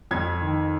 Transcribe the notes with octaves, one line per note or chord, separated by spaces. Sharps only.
F2 G#6
D#3